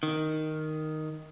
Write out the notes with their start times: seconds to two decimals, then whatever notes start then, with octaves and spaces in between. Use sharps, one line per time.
0.03 D#3